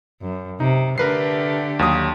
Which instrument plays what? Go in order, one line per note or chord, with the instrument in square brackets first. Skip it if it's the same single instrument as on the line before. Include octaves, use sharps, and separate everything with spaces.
[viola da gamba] F#2
[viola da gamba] C3 [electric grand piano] D#4
[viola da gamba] D3 A3 G4 [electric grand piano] A#4 B4 C7
[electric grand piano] D#2 F#3 D#6